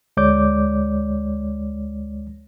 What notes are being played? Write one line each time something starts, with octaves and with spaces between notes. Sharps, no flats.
D2 G#3 C#5 D5 D6 G6